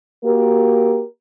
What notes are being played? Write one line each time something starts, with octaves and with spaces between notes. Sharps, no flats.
A#3 F#4 G4 A#4